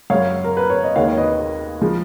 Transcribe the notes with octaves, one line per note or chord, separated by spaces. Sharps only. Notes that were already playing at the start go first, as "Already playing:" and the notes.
F#2 C#3 F#3 C#5 F5
A#4
B4
C#5
D#5
D#2 D#3 G#3 C#5 F5
C#5
B4 D#5
C#3 F3 G#3